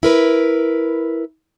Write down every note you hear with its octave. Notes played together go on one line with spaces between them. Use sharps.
E4 A#4 B4